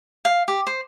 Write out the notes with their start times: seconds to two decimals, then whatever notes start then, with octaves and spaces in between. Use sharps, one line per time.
0.25 F5
0.48 G4
0.67 C5